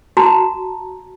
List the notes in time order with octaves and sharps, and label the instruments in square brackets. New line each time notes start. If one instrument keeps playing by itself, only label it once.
[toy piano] F#4 A5 A#5